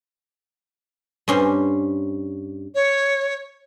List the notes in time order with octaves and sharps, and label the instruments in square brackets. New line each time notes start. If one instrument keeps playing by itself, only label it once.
[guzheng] G2 C#4 C5
[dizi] C#5